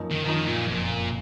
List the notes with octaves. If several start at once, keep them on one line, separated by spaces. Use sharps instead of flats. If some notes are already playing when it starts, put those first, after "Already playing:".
Already playing: F#2 F3 A#3 D#4
D#3
F#2 D#3 F3 A#3 D#4
G#2
A#2
F#1 F2 A#2 F3